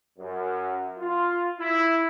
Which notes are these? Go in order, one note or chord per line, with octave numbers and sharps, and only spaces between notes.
F#2
F4
E4